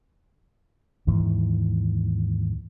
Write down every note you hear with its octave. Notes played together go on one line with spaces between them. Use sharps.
D#2 G#2 E3